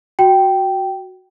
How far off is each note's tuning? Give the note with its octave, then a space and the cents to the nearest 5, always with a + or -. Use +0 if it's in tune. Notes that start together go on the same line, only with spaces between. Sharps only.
F#4 +0 G5 -10